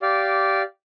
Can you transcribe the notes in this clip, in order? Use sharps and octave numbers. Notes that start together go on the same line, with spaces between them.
G4 D5 F5